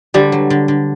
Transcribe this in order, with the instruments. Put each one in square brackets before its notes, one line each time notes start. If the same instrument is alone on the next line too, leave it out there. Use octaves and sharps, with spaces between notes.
[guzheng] D3 [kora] G3
[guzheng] F#3
D3
D3